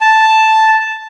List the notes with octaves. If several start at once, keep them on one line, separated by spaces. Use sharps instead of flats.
A5